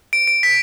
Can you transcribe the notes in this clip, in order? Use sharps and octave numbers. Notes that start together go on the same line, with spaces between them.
D7
D7
B6